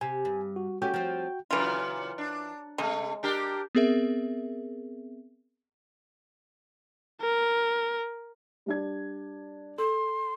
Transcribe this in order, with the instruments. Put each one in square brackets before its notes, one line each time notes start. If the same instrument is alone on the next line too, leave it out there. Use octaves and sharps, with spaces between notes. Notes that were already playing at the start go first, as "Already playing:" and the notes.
[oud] C3 [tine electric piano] G#5
[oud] G2
[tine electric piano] F#4
[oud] A3 C#4 G4 [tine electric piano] F#4 G5 G6
[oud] F3 C4
[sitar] A#2 C#3 F#3 [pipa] E3 F4
[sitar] D4
[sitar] C3 A3 [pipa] G#3
[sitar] D4 G4 A#4
[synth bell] B3 C4 G#4 A#4 E5
[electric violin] A#4
[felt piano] G3 D4 G#6
[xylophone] A4 [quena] C6